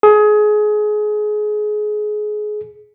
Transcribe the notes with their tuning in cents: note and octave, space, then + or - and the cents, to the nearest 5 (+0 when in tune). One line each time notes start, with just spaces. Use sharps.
G#4 +25